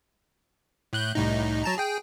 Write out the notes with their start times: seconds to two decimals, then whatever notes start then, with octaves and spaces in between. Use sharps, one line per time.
0.93 A2 F#6 G6
1.15 C2 A2 D#4
1.64 F#3 A5 A#5
1.78 G#4 G5